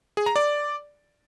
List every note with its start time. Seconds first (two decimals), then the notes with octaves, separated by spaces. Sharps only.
0.17 G#4
0.26 A#5
0.36 D5